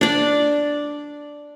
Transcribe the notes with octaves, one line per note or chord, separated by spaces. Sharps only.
D4 D5